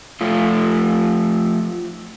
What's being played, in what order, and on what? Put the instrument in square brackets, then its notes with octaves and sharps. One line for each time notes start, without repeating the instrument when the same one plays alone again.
[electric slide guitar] F3 A3 F4